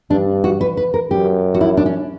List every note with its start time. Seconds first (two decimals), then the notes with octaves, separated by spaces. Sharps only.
0.10 G2 D4
0.44 F#4
0.61 B4
0.77 B4
0.94 A#4
1.10 F#2 G4
1.54 F#4
1.61 E4
1.77 D4
1.86 C#4